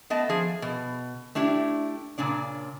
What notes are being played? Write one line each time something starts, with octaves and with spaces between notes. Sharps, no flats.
A3 B3 D#5 A5
F3 G#4
B2
A3 D4 E4 G4
A#2 C#3 D4 D5